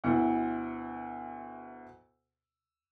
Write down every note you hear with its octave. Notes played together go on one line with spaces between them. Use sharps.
D2 B2 E4 F#5